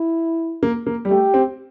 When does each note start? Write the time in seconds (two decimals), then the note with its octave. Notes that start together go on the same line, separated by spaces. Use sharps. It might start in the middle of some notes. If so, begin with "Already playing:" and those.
Already playing: E4
0.63 A#3
0.86 A#3
1.05 G3
1.10 A3 G4
1.34 C4